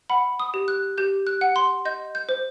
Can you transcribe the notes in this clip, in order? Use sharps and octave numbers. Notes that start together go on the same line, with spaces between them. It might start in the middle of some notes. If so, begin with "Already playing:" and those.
F#5 B5
D#6
G4
F#6
G4 G6
F#6
F#5
C6
D#5 G6
G6
C5